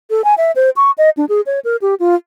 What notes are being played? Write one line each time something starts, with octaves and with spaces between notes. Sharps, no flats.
A4
G#5
E5
C5
C#6
D#5
D4
G#4
C#5
A#4
G4
F4